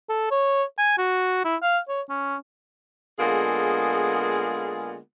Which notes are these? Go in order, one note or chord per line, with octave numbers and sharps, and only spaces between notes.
A4
C#5
G#5
F#4
E4
F5
C#5
C#4
D3 G#3 A#3 B3 F4 G#4